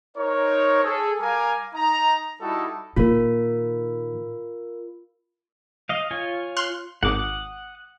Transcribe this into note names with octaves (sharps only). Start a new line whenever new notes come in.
D#4 A#4 C5 C#5
G#4 A4
G3 A#4 F5 G#5 A#5 D6
D#4 A#5
G3 D#4 E4 F#4 A4 A5
A#2 D#3 F4 A#4
D#5 F5
F4 C#5 G#5
C6 F6 F#6
G#1 F#5 D6 D#6